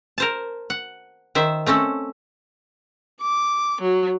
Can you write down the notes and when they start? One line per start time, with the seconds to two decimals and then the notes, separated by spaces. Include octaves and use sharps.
0.18 A#4 C5 A5
0.70 F#5
1.35 D#3 C5 E5
1.66 A3 C4 C#4 A4
3.21 D6
3.81 F#3